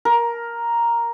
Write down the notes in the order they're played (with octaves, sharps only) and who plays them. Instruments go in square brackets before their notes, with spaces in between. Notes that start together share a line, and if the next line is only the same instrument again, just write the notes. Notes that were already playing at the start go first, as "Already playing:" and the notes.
[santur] A#4